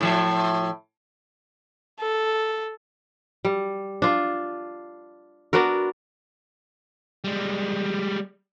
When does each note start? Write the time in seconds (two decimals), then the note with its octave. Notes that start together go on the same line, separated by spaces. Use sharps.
0.01 A2 F3 E5
2.01 A4
3.45 G3
4.02 D4 F4
5.53 B3 D4 F#4 A#4
7.24 G3 G#3